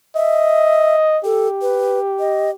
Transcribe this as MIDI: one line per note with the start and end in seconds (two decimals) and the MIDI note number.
0.16 1.19 75
0.16 0.96 76
1.25 2.55 67
1.25 1.48 69
1.62 1.99 71
2.19 2.50 75